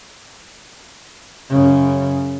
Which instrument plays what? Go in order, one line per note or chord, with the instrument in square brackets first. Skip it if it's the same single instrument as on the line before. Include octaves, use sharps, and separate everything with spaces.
[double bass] F#2 C#3